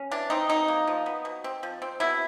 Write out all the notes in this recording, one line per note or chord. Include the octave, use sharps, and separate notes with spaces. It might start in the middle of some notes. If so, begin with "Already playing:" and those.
Already playing: C#4
E3 D4
C4 D#4
B2 D#4
A#3
F3
B3
B2
C4
F3
C4
B2 E4